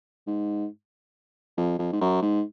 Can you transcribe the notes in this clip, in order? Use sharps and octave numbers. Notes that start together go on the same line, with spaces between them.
G#2
F2
F2
G#2
F#2
G#2